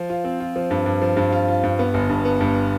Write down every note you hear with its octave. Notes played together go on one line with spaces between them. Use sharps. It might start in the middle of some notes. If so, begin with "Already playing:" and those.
Already playing: F3
F4
C4
F4
F3
G2
G2
F3
G2
F4
F4
G2
B3
G1
G2
B3
G2